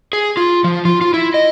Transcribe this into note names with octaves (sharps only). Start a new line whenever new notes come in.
G#4
F4
F3
F4
F4
E4
D#5